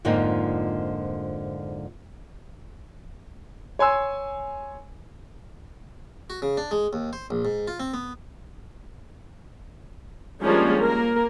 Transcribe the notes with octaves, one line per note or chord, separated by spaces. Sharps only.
F2 G#2 D3 F3 A#3 D#4
C#5 G#5 C6 E6
F#4
C#3
D4
G#3
D#2
C5
A#1
G#2
F4
C4
B3
F3 G3 G#3 A#3 C#4 D4
A#3 A#4